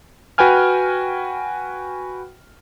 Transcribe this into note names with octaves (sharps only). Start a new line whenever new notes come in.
F#4 B4 G5 G#5 F6